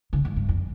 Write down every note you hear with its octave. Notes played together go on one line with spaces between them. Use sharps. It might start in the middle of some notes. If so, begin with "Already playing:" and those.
C#3
G2
G2
F2